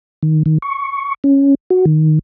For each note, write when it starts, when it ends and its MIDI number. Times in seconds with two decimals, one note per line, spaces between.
0.23 0.43 51
0.46 0.58 51
0.62 1.14 85
1.24 1.55 61
1.70 1.85 66
1.85 2.19 51